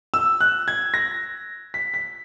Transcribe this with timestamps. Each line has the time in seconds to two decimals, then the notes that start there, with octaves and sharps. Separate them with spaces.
0.14 E6
0.41 F#6
0.68 G#6
0.94 A#6
1.74 B6
1.94 B6